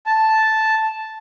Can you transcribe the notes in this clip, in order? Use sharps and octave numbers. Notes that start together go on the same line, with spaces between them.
A5